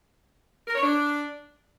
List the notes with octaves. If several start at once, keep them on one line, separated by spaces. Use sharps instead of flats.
A#4
C#5
D4